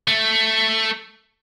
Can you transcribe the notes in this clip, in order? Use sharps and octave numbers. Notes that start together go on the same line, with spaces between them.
A3